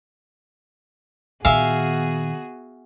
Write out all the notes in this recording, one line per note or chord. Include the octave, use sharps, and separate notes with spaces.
A#2 D#3 B3 F#4 G#4 E5 F5 G#5